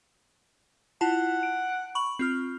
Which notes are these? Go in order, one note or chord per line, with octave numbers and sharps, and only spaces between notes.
E4 F4 F#5 A5
D7
B5 C#6 F#7
C4 F4 F6